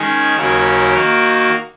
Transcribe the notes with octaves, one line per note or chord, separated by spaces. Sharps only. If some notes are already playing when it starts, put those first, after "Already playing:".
Already playing: D#3 G#3 C#4 G#4
D#2 C#3 F#3 C#4 A#4
D#3 A#3 F#4 A#4